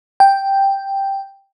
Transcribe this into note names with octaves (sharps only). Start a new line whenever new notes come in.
G5